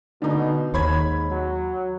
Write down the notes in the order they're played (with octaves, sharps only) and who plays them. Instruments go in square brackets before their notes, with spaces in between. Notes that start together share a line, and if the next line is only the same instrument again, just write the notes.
[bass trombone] B2 [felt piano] D3 D#4
[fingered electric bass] D#2 [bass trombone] G#2 [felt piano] C#5 B5 G#6
[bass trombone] F#3